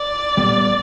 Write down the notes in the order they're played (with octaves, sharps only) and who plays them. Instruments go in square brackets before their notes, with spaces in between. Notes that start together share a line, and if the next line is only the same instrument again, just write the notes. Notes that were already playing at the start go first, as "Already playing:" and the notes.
Already playing: [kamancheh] D5
[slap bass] A#2 G3 B3